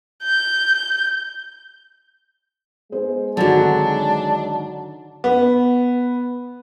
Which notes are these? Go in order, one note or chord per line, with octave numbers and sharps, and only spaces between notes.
G6
G#3 B3 G#4 C5
G#1 D3 D#3 F#3 D4
B3